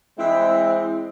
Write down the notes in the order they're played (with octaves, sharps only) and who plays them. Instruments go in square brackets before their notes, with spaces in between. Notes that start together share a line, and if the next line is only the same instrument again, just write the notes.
[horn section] E3 G#3 C4 [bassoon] E4